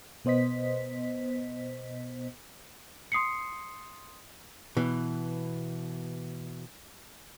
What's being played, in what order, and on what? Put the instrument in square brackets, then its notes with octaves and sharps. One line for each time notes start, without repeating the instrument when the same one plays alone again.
[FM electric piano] B2 B3 C5 D#5 B6
[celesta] C6 D#6 C7 C#7
[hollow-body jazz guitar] B2 E3